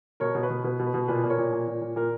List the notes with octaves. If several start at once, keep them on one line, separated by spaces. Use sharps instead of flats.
B2 A#4 C#5
B2
B4
B2
B2 B4
B2
B4
B2
A#2 B4
A#2
A#4 C#5
A#2
A#2
A#2
A#2
A#2 A#4